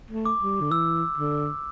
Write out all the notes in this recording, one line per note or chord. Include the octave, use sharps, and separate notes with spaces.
A3
D6
G3
D3
E3 E6
D3